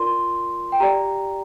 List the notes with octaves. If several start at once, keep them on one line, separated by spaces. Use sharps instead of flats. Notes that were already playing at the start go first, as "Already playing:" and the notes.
Already playing: F4 A#4 D5 C6
G5
G4 D5 A#5